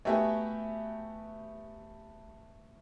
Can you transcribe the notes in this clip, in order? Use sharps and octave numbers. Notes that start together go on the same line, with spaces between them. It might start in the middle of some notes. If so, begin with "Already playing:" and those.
A3 B3 F#4 G4 E5 G#5